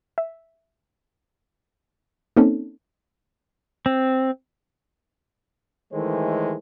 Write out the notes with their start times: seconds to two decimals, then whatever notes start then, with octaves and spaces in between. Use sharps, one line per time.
0.18 E5
2.37 A#3 C4 C#4 D#4 A4
3.86 C4
5.94 D#3 E3 G#3 A3 C5